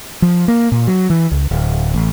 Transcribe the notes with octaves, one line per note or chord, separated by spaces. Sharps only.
F3
A#3
A#2
F#3
E3
C#2
D1
A1